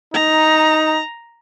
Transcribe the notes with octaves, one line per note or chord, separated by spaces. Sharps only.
D#4 A#5